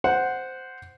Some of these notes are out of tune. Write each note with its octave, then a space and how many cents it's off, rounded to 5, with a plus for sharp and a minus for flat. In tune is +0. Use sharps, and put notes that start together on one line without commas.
C5 -5 F#5 +0